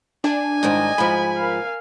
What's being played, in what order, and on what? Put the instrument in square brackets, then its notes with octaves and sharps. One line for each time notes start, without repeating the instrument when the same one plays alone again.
[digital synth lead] D4 [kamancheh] G#5
[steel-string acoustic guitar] G#2 D#3 G3 [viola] D#5
[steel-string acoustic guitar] G#2 F3 [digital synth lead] B5
[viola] A#4 F5